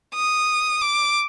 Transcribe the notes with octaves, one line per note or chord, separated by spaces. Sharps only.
D#6
D6